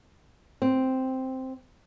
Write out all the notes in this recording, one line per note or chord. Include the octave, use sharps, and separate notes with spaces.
C4